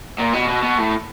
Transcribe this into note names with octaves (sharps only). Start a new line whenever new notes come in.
A#2
B2
B2
B2
A2